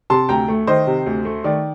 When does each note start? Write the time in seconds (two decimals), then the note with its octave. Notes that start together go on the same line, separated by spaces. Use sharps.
0.10 C3 A5 C6
0.29 D2 G5 A#5
0.48 A3
0.67 D#3 C5 D#5
0.87 C3
1.06 D2
1.25 A3
1.44 D#3 D5